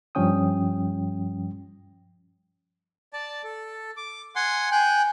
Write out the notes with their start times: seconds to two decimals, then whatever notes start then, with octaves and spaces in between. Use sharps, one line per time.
0.15 G2 F3 G3 C#4 G5 D#6
3.13 D5 A5
3.44 A4
3.97 D6
4.36 F#5 G#5 C6
4.72 G5 G#5 F#6